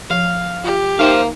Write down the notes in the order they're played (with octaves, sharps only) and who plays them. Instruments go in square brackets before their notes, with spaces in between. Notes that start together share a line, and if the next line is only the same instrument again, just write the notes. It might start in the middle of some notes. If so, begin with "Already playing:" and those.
[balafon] F3 [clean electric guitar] F5
[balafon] F4 [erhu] G4
[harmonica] A#3 [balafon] D#4 E5 G5 [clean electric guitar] C5 F5